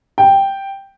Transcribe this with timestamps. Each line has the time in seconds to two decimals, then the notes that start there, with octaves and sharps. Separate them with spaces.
0.18 G5